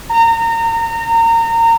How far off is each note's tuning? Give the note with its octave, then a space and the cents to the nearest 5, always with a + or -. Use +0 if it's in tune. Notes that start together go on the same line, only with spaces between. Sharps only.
A#5 -30